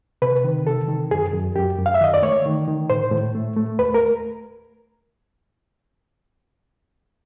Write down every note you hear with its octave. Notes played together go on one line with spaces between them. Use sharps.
C3 B4
D#3
C3 A4
D#3
F#2 G#4
F#2
F#2 G4
F#2
F5
E5
D#3 D#5
D5
A3 C#5
D#3
D#3
A2 C5
A2
A3
A3
D#2 B4
A#4